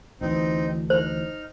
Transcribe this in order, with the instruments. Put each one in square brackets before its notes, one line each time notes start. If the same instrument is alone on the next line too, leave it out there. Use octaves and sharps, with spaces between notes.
[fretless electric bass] D2 E3 [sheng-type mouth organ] C4 D#4
[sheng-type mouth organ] D#4 F6 [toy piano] C5